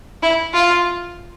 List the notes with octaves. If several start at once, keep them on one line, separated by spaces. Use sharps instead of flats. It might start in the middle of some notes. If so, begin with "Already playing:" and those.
E4
F4